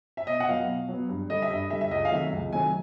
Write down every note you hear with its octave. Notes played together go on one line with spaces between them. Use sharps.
E5
B2 D#5
F#5
F#3 B3 F5
B2
F#3 B3
G2
D3 G3 D#5
E5
G2 D#5
D3 G3 E5
E5
C#2 D#5
F5
C3 D#3 F#3 A3 E5
C#2
C3 D#3 F#3 A3 G#5